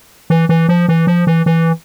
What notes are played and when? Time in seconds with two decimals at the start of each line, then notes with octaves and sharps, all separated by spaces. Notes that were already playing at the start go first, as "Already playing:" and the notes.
0.30 E3
0.49 E3
0.69 F3
0.89 E3
1.07 F3
1.27 E3
1.46 E3